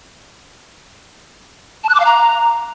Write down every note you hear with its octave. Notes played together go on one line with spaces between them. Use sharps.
A5
F#6
D6
F5
A#5